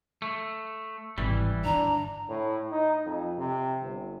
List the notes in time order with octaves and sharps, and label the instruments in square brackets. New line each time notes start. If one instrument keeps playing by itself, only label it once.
[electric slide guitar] A3
[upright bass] G#1 C3 [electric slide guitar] E3 G3
[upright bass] G2 D3 [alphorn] D4 [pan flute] A#5
[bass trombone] A2
D#4
F2
C3
G1